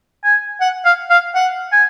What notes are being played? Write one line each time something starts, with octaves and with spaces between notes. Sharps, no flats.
G#5
F#5
F5
F5
F#5
G#5